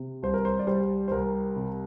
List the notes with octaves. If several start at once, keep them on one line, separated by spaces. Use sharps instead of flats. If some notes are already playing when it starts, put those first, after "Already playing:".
Already playing: C3
C2 C5
A#4
C5
D5
G3 C5
C5
C2 A#4
C3